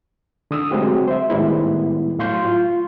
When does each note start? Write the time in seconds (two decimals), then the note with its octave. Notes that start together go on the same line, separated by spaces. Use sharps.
0.51 D3 D#6 E6
0.71 F#3 G#3 A3 C4 F#4 G4
1.08 C5 E5
1.30 A2 D#3 G3 G#3 B3 E4
2.19 A2 F#3 F5 C6 C#6 G6
2.45 F4